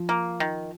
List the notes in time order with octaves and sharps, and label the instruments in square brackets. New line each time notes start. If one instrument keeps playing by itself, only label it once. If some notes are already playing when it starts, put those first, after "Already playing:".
Already playing: [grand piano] F3
[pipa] A#3
D#3